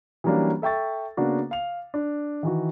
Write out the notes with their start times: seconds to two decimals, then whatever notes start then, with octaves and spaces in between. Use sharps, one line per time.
0.24 E3 F#3 G3 A#3 C#4 D4
0.62 A4 E5 G5 C#6 A6
1.17 C#3 A#3 B3 D4 F#4
1.51 F5 F7
1.94 D4
2.43 D#3 E3 F#4